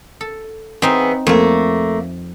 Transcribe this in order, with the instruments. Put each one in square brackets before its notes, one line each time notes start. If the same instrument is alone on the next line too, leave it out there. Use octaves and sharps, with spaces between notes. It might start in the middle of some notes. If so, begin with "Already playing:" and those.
[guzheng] A4
[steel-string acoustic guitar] E3 B3 G#4 [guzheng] C4 D#4
[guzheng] F2 [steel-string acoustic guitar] A3 A#3